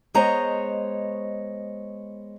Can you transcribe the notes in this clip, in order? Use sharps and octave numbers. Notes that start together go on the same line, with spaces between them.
G#3 B3 C5 C#5 D#5 A#5